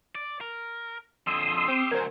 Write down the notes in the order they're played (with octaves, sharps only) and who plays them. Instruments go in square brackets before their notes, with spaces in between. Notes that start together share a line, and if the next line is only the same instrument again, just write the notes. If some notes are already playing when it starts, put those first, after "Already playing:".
[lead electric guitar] D5
A#4
[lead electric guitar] F2 D3 [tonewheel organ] C6 D#6 E6
[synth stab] C4 [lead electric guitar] G4
[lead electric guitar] D2 F#3 [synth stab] A#4 C5 [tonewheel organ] G#5